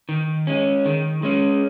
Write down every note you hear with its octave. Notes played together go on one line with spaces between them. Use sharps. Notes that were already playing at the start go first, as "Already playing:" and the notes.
D#3
G#3 C#4
D#3
G#3 C#4